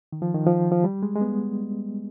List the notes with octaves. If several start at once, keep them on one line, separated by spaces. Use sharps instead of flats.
D#3
F3
D#3
F3
F3
G3
G#3
G#3
B3